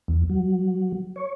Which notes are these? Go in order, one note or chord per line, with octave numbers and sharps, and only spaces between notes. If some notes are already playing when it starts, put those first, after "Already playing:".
E2
F#3
C#5